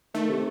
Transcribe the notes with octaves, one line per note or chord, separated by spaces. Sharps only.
D#3 A3
C3